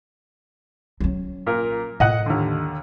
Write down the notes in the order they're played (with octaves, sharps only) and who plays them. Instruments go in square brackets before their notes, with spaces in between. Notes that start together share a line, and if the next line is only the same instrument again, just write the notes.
[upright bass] F#3 C#4
[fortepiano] A#2 A#4
[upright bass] A2 [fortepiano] D#5 F#5 F#6
[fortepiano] D#2 D3